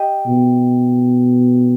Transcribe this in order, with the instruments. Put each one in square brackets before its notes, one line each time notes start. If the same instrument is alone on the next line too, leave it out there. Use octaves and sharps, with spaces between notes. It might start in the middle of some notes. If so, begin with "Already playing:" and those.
Already playing: [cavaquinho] G4 D#5
[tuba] B2